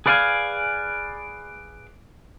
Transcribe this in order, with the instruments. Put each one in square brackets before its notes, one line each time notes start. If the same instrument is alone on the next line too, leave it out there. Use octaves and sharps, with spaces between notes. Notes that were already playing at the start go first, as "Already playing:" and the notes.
[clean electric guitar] G#4 B4 D5 F5 G5 G#5